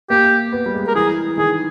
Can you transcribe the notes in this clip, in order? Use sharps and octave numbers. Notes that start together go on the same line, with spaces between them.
A#3 G4
B3
G3
G#3
A#4
E3 G#4
D#3 G#4